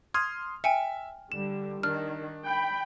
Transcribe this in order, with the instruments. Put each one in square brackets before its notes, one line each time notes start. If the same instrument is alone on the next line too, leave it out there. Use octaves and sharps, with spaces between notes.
[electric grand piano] C6 D#6 F6 [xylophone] G#6
[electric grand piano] E5 [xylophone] G5 G#5 C#7
[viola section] D3 G3 [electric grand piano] E7
[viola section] D#3 [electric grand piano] D4 [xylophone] F6
[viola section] G5 B5